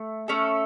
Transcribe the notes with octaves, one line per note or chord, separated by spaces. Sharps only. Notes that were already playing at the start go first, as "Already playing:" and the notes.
Already playing: A3
A3 C#4 A4